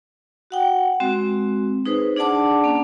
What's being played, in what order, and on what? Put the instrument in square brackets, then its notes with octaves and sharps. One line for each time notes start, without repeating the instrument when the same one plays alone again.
[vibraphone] F#4 F#5 G5
G#3 C4 F#4
D#4 G#4 B4 C5
D4 G#4 D5 F#5 A5 D6
A#3 C#4